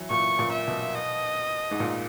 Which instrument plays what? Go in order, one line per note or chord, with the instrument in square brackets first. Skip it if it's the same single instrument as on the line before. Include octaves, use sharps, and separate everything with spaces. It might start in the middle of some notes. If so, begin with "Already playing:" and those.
Already playing: [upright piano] E3 F#3
[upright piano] A#2 [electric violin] C#6
[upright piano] A#2
[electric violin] E5
[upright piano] B2
[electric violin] D#5
[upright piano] G#2
A#2